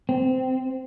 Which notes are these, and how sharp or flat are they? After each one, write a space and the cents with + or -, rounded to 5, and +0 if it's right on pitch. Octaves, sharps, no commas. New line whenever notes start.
C4 -20